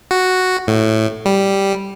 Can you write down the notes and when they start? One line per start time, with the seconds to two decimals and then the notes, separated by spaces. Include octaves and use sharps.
0.11 F#4
0.67 A2
1.25 G3